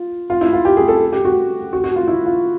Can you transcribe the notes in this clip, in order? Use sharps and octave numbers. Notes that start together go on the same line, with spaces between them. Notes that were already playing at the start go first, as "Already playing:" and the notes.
Already playing: F4
F4
E4
F4
G4
G#4
A4
G4
F#4
F#4
F#4
F4
E4
F4